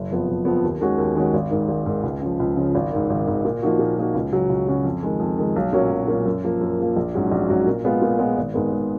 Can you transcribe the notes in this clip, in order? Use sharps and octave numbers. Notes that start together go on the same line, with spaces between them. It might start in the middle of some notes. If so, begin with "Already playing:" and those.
Already playing: F#1
F2 F3 B3
F#1
F2 F3 B3
D#2
D#3 G#3 C#4 F#4
D#2
D#3 G#3 C#4 F#4
G#1
G#2 D#3
G#1
G#2 D#3
C#2
C#3 F3
C#2
C#3 F3
G#1
G#2 D#3
G#1
G#2 D#3
A#2
F3 A#3 D#4 F#4
A#2
F3 A#3 D#4 F#4
C#2
C#3 F#3 C#4 F#4
C#2
C#3 F#3 C#4 F#4
F2
D#3 G#3
F2
D#3 G#3
B1
A#2 F#3 C#4
B1
A#2 F#3 C#4
F#2
F3 A#3
F#2
F3 A#3
A#1
G#2 F#3 C#4 F#4
A#1
G#2 F#3 C#4 F#4
A#2
G#3 B3 F4
A#2
G#3 B3 F4
G#1
G#2 D#3 G#3 B3
G#1